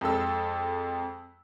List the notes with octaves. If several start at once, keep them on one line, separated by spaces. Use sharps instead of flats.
F2 G#3 A4 E6